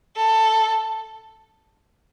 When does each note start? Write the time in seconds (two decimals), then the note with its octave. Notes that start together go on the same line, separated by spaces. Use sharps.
0.16 A4